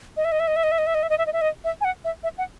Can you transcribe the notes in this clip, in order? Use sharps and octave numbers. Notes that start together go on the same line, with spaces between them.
D#5
E5
D#5
E5
D#5
E5
D#5
E5
D#5
E5
D#5
E5
D#5
E5
D#5
E5
D#5
E5
G#5
F#5
E5
E5
F#5